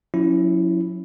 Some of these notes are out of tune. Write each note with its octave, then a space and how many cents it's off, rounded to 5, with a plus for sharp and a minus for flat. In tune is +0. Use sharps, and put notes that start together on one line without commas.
F#3 -45 C#4 +5 E4 +0